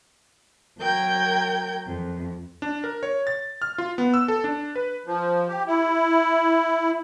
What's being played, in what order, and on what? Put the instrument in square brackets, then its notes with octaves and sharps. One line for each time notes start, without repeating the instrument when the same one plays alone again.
[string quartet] F#3 A#4 G5 G6 G#6
F2
[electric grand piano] D4
A#4
C#5
A6
F6
F4
B3
E6
A4
D4
B4
[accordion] F3
G4
E4